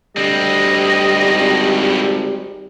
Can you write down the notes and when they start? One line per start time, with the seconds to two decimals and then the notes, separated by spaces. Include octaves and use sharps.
0.17 D2 D3 G3 C4 D#5
1.26 G#1